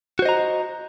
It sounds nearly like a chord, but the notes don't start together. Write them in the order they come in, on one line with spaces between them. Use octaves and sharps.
F#4 C5 D#5 A#5